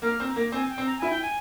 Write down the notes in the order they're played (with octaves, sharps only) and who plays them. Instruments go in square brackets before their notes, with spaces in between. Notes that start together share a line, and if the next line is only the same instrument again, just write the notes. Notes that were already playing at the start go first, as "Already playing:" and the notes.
[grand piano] A#3 [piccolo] F6
[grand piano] C4
[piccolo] A#5
[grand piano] A#3
[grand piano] C4 [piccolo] G#5
[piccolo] G5
[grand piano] C4
[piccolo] A#5
[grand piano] E4 [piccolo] G#5
[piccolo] G5
G#5